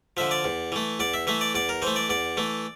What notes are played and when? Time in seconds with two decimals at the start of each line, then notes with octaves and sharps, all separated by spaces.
0.17 D3 F3 E5
0.31 D5
0.44 E2
0.72 E3 A3
1.00 E2 D5
1.14 E5
1.27 E3 A3 E5
1.41 D5
1.55 E2 D5
1.69 A#4
1.82 E3 A3 C5
1.96 D5
2.10 E2 D5
2.37 E3 A3